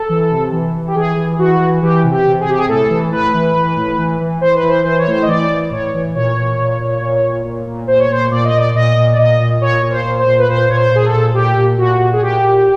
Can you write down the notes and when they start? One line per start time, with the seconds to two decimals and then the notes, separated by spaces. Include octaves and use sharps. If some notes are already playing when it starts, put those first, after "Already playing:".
Already playing: A4
0.09 E3
0.31 C3
0.52 E3
0.74 E3
0.88 G4
0.95 E3 G#4
1.16 E3
1.39 E3 F#4
1.60 E3
1.82 E3 G4
2.04 C3
2.11 G4
2.25 C3
2.40 G#4
2.46 C3 G4
2.58 G#4
2.69 A2 A4
2.90 E3
3.11 A2 B4
3.34 E3
3.55 E3
3.76 A2
3.98 E3
4.20 E3
4.41 E3 C5
4.54 B4
4.63 E3
4.68 C5
4.84 E3 C5
4.98 C#5
5.07 A2 C5
5.22 D#5
5.28 E3 D5
5.49 E3
5.71 A2 C#5
5.94 E3
6.15 A#2 C#5
6.36 A#2
6.58 A#2
6.80 A#2
7.01 A#2
7.23 A#2
7.45 A#2
7.67 A#2
7.87 A#2 C5
7.99 C#5
8.10 A#2 C5
8.31 A#2 D5
8.45 D#5
8.53 A#2 D5
8.75 A#2 D#5
8.96 A#2
9.12 D5
9.18 A#2 D#5
9.40 A#2
9.61 A#2 C#5
9.82 A#2
9.91 C5
10.04 A#2
10.19 C5
10.26 A#2
10.39 B4
10.48 A#2 C5
10.69 A#2 C#5
10.76 C5
10.91 A#2 G#4
11.06 A4
11.13 A#2
11.34 A#2 G4
11.57 A#2
11.78 A#2 F#4
11.99 A#2
12.13 G#4
12.21 A#2 G4
12.42 A#2